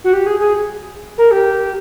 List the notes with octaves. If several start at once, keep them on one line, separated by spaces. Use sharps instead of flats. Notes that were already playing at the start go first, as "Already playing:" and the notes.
F#4
G4
G#4
G#4
A#4
G4